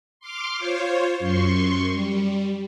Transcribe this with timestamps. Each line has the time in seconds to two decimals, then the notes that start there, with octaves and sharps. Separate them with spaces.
0.20 C6 D6 F6
0.58 F4 C5 C#5
1.19 F#2 C6 C#6
1.91 G3